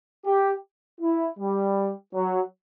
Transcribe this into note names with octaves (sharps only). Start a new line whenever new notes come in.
G4
E4
G3
F#3